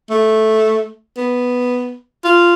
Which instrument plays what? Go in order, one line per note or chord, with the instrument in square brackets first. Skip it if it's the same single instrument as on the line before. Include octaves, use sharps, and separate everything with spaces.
[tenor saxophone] A3
B3
F4